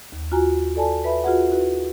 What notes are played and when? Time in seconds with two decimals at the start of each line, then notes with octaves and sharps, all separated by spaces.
0.12 D#2
0.32 F4 F#4 G#5 A#5
0.76 A4 D5 G#5 A5
1.04 B4 E5 B5
1.24 F4 F#4 G#4 B4 F#5
1.51 E4 F#4 B4